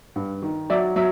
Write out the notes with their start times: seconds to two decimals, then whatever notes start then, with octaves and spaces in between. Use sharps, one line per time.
0.16 G2
0.42 D#3
0.70 F#3 D5 E5
0.96 F#3 E5